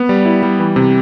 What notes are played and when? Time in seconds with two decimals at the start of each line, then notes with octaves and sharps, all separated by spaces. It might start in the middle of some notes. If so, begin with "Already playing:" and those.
Already playing: B3
0.09 G3
0.25 E4
0.43 G3
0.59 E3
0.76 C3